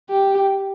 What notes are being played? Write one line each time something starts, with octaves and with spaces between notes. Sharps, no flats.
G4